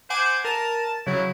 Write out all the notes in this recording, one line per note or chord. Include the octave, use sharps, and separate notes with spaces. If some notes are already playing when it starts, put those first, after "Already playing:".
C5 F#5 G#5 D6
A#4 A5 D#7
C#3 F#3 E4